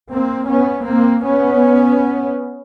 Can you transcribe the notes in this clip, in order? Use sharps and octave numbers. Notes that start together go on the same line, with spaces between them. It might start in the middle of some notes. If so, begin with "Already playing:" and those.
A#3 C4
B3 C#4
A#3 C4
B3 C#4